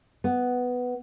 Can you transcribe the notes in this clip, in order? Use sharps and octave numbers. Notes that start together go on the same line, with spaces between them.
B3